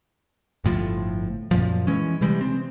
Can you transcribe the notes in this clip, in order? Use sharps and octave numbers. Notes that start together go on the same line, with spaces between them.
G1 A2 F3
F#2 A#2 F3
E3 G#3 C#4
C3 E3 G3 G#3
C4